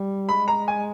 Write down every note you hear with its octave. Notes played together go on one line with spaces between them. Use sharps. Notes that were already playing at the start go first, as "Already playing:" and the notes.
Already playing: G3
G#3 B5
A#5
G#5